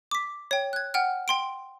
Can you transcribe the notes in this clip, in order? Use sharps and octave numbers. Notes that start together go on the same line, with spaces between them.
D6 B6
C#5 G5
F#6 G#6
F#5 G5 F6
G5 C6 D7